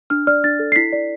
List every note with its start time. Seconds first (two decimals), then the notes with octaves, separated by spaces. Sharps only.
0.10 D4 F6
0.27 D5 F6
0.44 D4 A6
0.59 A4
0.72 C7
0.76 E4 B6
0.93 D5